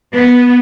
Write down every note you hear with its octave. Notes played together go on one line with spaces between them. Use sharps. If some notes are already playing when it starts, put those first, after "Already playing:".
B3